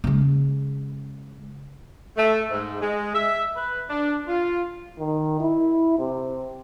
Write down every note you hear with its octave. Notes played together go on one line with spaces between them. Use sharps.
C#3 G#3
A3
G#2
G#3
E5
B4
D4
F4
D#3
E4
C3